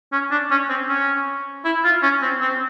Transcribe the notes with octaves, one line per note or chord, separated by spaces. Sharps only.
C#4
D4
C#4
C4
C#4
E4
F4
C#4
C4
C4